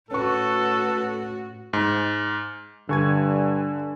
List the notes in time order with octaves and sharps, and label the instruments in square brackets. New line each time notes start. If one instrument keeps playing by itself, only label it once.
[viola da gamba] A2 F#4 [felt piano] C#4 C#6 [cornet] A4 [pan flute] B4
[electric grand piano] G#2
[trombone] G2 [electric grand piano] D3 C#6 G#6 [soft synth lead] G#5